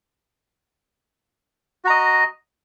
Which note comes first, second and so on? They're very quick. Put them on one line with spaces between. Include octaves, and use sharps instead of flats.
F#4 A#5 D#5